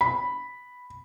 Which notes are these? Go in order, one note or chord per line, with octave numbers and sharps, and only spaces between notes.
B5